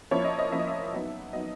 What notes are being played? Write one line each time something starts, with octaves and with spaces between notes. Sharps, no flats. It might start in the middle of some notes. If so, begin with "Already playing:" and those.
F3 A#3 C#4 E4 C#5
D#5
D#5
F3 A#3 C#4 E4 E5
D#5
E5
F#3 B3 D#4
F#3 B3 D#4 D#5